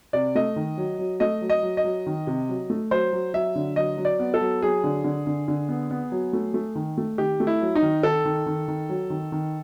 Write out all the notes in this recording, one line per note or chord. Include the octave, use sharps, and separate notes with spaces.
C3 D5
A3 D#5
D#3
F#3
F#3
A3 D#5
F#3
D#5
F#3
D#5
F#3
D#3
C3
F#3
A3
F#3 C5
F#3
F#3 E5
D3
F#3 D#5
F#3
D5
B3
A4
F#3
F#3 G#4
D3
D3
D3
D3
B3
B3
F#3
A3
A3
D#3
A3
D#3 G4
A3
E4
F#3
D#4
D#3
D#3 A4
D#3
D#3
D#3
F#3
D#3
D#3